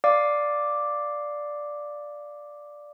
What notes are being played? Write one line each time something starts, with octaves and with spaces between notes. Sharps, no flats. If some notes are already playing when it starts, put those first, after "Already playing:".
D5 F5 D6